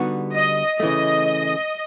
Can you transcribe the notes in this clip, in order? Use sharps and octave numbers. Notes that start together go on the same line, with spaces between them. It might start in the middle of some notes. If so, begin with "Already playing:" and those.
Already playing: D3 G3 B3 D#4 F#4
D#5
C#3 E3 A3 D#5